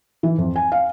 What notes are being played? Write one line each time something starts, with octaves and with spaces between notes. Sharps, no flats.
E3
F2
G#5
F5